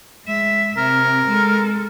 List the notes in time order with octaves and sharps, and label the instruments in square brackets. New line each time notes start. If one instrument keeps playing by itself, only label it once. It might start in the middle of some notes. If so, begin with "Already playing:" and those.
[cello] G#3 E5
[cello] C3 [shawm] A#4
[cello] G#3 A4